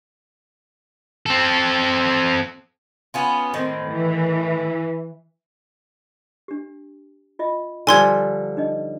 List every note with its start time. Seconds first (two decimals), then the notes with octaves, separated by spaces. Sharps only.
1.26 C4 A4
3.14 B3 C#4 F4
3.54 A2 D#3 C4
3.90 E3
6.48 D4 G4
7.39 F4 D#5 E5
7.87 D3 F3 G3 G#5 C6 G#6
8.57 D4 D#4 D#5